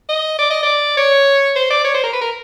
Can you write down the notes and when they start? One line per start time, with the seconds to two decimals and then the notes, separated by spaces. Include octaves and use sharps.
0.09 D#5
0.39 D5
0.50 D#5
0.63 D5
0.97 C#5
1.56 C5
1.71 D5
1.85 C#5
1.94 C5
2.04 A#4
2.13 B4
2.22 A#4